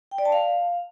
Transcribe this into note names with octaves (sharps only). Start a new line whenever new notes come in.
G5
D5
A5
F5